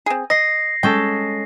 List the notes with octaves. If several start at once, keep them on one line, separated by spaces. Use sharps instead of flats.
C4 G#4
D#5 A#6 C7
G#3 C#4 A4 G5